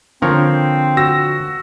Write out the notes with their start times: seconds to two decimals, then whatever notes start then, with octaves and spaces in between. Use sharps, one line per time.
0.22 D3 F3 C4 A#4 C#5
0.97 F#4 E6 A#6